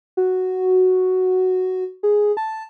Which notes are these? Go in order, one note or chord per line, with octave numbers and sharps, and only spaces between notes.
F#4
G#4
A5